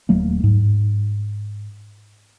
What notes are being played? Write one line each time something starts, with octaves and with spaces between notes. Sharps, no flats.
D#1 F#3 A3 A#3
G#2